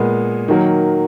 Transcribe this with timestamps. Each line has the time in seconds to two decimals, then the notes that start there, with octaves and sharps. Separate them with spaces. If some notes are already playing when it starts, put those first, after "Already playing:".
Already playing: A#2 G#3 B3
0.48 D#3 F#3 A#3